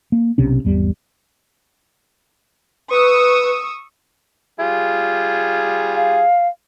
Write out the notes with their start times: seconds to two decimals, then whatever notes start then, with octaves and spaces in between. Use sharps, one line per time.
0.12 A#3
0.38 B1 C3 C#4
0.65 G#1 E2 G3
2.91 B4 C#6 D#6 E6
4.60 G3 F4 G#4
5.95 F5